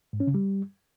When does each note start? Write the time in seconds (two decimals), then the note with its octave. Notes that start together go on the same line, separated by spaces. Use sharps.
0.13 G#2
0.20 C#4
0.27 C#3
0.35 G3